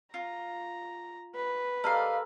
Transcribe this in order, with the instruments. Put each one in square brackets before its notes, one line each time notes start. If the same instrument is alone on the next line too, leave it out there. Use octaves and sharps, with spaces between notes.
[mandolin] F4 [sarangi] A#5
[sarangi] B4
[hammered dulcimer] G4 A4 A#4 [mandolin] D5 D#5 F5